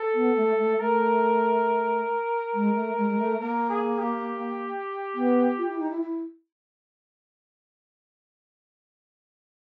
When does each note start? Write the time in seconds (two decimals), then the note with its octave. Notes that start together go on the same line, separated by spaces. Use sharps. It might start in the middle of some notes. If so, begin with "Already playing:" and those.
Already playing: A4
0.14 B3
0.36 A3
0.58 A3
0.80 A3 A#4
2.54 G#3
2.75 A3
2.97 G#3
3.09 G#3
3.19 A3
3.41 A#3 A#4
3.70 G#4
3.98 G4
5.14 B3
5.58 F4
5.69 E4
5.79 D#4
5.90 E4
6.02 E4